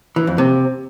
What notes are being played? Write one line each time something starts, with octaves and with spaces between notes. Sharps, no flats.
E3
F2
C3